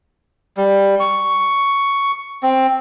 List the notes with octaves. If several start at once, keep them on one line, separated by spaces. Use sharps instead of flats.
G3
C#6
C4